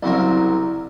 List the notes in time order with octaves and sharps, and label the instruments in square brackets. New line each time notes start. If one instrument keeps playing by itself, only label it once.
[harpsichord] C2 C#3 F#3 C4 A#4